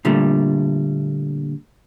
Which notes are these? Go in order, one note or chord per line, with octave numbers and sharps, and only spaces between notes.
A#2 D3 G3 A3